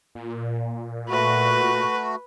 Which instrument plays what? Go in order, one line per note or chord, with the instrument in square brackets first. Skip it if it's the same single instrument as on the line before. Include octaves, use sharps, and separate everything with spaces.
[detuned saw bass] A#2
[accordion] A3 F#4 [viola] B4